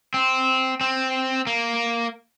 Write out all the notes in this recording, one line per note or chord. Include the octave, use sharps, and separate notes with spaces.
C4
C4
A#3